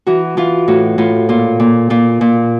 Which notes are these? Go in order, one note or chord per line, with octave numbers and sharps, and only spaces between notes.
E3 F#4
E3 F4
A2 F#4
A2 F4
A#2 F4
A#2
A#2 F4
A#2